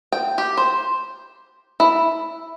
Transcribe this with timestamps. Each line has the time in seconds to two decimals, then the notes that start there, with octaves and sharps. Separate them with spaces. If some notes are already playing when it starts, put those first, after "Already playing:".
0.12 G5
0.38 G4
0.57 C5
1.80 E4